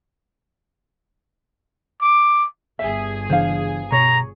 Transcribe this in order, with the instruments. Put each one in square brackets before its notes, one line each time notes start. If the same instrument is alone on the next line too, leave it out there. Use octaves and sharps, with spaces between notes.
[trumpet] D6
[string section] G1 G#4 [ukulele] E5
[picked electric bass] C#3 E3 D4 [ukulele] C5 F5
[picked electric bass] B2 [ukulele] C#5 [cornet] A#5